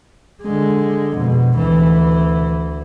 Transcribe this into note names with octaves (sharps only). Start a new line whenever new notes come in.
D3 G#3
F2 B2
D2 E3